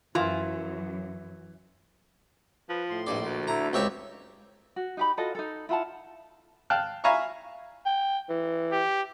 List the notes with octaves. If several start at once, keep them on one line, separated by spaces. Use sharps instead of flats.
F#2 E3 F4
F3 B4
A2 C6
A#1 G2 D5
D2
D3 A3 E4 A#5
C#2 C4 G4 C#5 E5
F#4
D#4 G4 B5
F4 F#4 A4 D#5
D#4 A4
E4 F4 F#5 A5
F5 G5 A5 F6 F#6
E5 F5 G#5 A#5 B5 C#6
G5
E3
G4